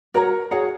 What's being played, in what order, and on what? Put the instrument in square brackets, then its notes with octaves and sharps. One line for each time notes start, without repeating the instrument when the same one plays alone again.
[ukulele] F#4 C#5 F#5 A#5 [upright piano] A#4
[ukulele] F#4 C#5 F#5 A#5 [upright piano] G#4